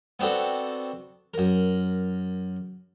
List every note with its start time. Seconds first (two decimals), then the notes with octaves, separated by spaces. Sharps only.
0.20 B3 C4 D4 F#4 A4
1.34 F#2 A#4